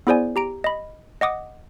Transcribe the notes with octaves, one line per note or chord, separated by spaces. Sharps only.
B3 E4 G#4 C5 D5 G#5
G4 A#5 D7
D#5 B5
D#5 F#5 D6 D#6